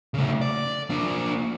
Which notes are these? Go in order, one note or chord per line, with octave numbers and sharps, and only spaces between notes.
C#3 A3
D5
A#3 D4